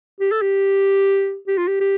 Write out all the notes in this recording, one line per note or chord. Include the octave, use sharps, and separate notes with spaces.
G4
A4
G4
G4
F4
G4
G4